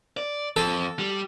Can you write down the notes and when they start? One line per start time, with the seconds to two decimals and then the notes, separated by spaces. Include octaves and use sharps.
0.17 D5
0.56 F2 A4
0.99 G3